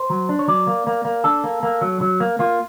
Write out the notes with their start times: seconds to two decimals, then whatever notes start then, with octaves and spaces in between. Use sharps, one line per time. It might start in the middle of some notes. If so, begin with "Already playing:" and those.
Already playing: C5
0.10 F#3
0.29 D4
0.39 C#5
0.48 F#3 D5
0.67 A#3
0.87 A#3
1.05 A#3
1.24 D4 A4
1.44 A#3
1.63 A#3
1.81 F#3
2.01 F#3
2.20 A#3
2.39 A#3 F4